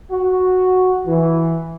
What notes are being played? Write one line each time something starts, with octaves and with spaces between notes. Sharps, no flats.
F#4
E3